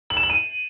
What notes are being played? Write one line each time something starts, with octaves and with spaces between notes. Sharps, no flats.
F#7
E7
F#7
D#7